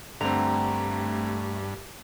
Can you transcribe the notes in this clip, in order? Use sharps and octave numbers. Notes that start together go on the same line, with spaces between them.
G2 D3 A3 C4 A#5